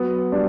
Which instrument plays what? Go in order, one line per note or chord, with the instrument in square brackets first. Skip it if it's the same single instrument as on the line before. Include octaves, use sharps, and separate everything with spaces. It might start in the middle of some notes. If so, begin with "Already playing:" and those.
Already playing: [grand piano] F#3 [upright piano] B3
[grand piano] G3 [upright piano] D4